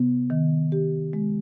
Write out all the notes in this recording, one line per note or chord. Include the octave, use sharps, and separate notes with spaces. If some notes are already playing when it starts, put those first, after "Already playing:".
Already playing: C3 B3
D#3
G4
G#3